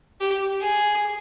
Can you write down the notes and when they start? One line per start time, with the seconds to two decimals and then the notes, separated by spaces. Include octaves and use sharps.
0.20 G4
0.60 G#4